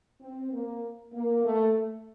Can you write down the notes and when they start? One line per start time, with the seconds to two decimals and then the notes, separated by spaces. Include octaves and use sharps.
0.21 C4
0.52 A#3
1.13 A#3
1.44 A3